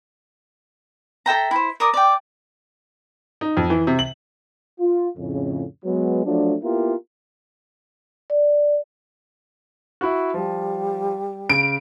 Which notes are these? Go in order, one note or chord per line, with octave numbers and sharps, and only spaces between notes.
A4 E5 G5 A#5
E4 C5
A#4 D5 D#6
D5 G5
D#4
F2
E3
C3
F#7
F4
F2 A2 C#3
F#3 G#3 B3
F3 F#3 A3 D4
A#3 B3 E4 F4 G4 A#4
D5
E4 F#4
F3 G3
C#3 D7